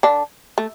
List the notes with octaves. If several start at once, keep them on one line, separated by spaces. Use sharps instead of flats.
D3 D4
A3